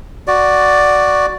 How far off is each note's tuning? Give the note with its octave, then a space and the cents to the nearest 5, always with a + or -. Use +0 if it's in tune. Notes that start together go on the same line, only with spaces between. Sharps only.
F#4 +0 D5 +0